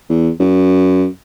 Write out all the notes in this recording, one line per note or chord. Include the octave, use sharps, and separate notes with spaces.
E2
F#2